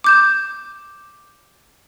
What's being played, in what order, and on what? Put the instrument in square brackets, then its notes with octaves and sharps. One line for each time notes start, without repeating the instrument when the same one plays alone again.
[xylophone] D6 G6 E7